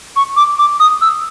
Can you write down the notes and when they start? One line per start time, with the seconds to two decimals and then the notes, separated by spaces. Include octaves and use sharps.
0.16 C#6
0.37 D6
0.59 D6
0.80 D#6
1.01 E6